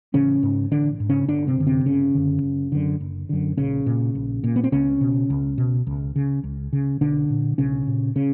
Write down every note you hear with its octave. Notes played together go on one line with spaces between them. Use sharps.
A1 C#3 C#4
G#2
A1 D3 D4
G#2
C#3 C#4
G1 D3 D4
C3 C4
F#2 D3
C3 C4
G1 C#3 C#4
F#2 D3
F#1
F#2 D3
F#1
F#2 D3
A#1 C#3 C#4
A#2
A#1
A#2
B3
C4
C#2 C#3 C#4
B2
C#2
B2
C#2
C#3
C#2
C#3
B1 D3 D4
A#2
B1 C#3 C#4
A#2
C#3 C#4